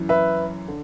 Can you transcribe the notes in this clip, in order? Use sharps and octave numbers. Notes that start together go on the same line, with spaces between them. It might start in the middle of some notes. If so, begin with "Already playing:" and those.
Already playing: F#2 E3
B4 E5
D3